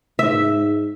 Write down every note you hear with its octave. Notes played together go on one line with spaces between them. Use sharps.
G#2 E5